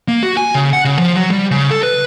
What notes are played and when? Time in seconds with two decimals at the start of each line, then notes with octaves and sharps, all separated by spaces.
0.08 A#3
0.23 F#4
0.37 G#5
0.55 C#3
0.73 F#5
0.85 C#3
0.98 F3
1.16 F#3
1.31 G3
1.51 C#3
1.71 A4
1.83 B4